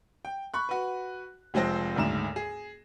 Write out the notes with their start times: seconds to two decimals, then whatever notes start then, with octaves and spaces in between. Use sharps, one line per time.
0.25 G5
0.54 B5 C#6 F#6
0.69 F#4 B4
1.54 F1 F3 G#3 C4 C5 A#6
1.96 F#1 D2 G#2 E7
2.36 G#4